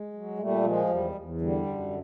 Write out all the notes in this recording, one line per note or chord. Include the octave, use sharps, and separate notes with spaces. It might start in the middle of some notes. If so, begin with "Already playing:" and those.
Already playing: G#3
F#3
A#2 G3 A3
F3 G#3
E2 G3
E2
D3 G3
F#2